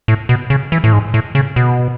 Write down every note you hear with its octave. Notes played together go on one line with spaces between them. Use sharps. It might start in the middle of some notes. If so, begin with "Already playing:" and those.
A2
B2
C#3
E3
A2
G#2
A2
C#3
B2